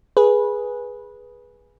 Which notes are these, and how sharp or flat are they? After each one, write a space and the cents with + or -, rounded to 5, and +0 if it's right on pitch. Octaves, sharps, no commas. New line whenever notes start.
G#4 +0 B4 -15